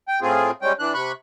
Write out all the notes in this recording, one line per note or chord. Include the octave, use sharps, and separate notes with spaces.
G5
A2 A3 C4 F4 G#4
G3 G#3 C#4 G5
E3 D4 F#6
C3 B5 C#6 F#6